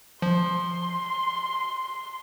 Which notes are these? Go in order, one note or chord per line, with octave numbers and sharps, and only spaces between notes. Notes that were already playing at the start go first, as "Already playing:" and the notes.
F3 C6